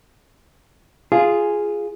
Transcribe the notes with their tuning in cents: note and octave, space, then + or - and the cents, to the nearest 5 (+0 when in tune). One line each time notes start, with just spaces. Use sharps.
F4 -5 G#4 +0